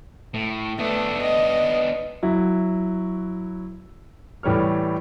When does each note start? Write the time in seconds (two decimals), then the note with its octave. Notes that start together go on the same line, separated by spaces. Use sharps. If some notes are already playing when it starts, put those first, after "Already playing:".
0.34 A2
0.79 A3 B3 D4
1.22 D#5
2.22 F#3 E4 F#4
4.43 A2 E3 G3 C#5 F6